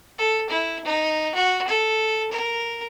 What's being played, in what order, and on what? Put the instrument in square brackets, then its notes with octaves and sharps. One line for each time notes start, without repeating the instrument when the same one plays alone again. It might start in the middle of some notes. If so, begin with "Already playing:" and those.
[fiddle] A4
E4
D#4
F#4
A4
A#4